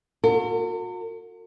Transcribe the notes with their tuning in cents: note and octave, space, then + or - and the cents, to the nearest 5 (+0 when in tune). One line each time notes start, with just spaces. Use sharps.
F#4 -40 A#4 -45